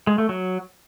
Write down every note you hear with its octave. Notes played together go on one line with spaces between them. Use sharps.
G#3
A3
F#3